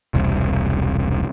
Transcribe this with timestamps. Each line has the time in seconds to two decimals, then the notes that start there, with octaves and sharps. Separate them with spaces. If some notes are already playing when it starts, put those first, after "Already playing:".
0.14 E1 C2